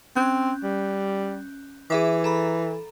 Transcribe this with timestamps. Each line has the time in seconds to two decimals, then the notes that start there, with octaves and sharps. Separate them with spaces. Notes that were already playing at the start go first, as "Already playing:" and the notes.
0.16 C4 C#4 F#6 G6
0.64 G3
1.90 E3 G#4 E5 D6
2.24 A4 A#5 B5